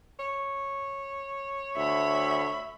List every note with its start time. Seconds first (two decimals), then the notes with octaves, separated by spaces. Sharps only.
0.19 C#5
1.76 D2 E5 B5